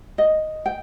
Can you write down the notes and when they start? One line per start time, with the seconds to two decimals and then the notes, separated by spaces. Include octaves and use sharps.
0.18 D#5
0.66 G5